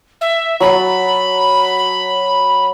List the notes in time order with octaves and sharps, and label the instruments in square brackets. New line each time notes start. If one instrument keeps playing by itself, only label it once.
[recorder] E5
[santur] F#3 A5 [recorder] B5